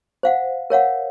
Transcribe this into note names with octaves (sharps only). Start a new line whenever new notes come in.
C5 F5 F#5
A#4 C#5 F5 F#5